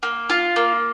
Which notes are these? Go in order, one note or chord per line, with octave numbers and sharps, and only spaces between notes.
A#3
F4
A#3